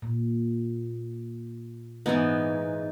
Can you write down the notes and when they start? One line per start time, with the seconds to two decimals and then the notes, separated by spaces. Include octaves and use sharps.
0.02 A#2
2.06 G#2 E3 B3 D#4